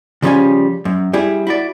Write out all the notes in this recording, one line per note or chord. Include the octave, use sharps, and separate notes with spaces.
C#3 F3 G3 C#4 F5 G#5
F#2
G3 E4 G#4
E4 F#4 D5